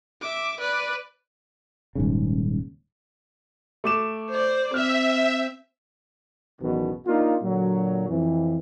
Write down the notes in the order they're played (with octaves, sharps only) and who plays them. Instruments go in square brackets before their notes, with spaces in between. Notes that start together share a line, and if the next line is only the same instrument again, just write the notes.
[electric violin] E5 D6
B4 D5
[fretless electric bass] D#1 G#2 C#3
[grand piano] A3 D6 E7
[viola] C5 D5
[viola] C4 [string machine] E5 [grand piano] F6
[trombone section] A1 E2 B2 D#3 F#3
A#3 D4 D#4 F4
A#2 D3 F#3
F2 E3